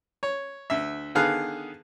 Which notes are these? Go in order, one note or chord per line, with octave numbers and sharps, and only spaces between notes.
C#5
D2 E5
D3 D#3 B3 G#4 F5 F#6